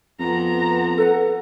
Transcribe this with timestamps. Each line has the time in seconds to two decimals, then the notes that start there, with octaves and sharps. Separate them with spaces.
0.19 F2 B3 A#5
0.98 A4 B4 F#5